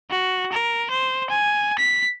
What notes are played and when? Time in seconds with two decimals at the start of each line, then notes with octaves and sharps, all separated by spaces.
0.10 F#4
0.52 A#4
0.90 C5
1.30 G#5
1.78 B6